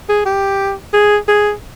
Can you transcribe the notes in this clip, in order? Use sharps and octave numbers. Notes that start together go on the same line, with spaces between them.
G#4
G4
G#4
G#4